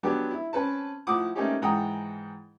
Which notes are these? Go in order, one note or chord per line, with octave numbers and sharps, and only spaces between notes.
F#3 B3 D4 G4
E4
C4 C#4 B4 A5
A2 F3 F#5 D6 D#6
A3 A#3 C4 C#4 D#4 G4
G#2 E3 F#5 G5 A#5 D#6